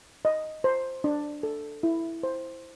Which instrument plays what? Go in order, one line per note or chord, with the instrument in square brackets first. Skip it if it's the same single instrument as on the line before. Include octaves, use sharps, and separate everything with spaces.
[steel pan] D#5
C5
D4
A4
E4
C5